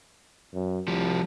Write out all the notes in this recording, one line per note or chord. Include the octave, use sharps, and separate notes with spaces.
F#2
C2 F3 G3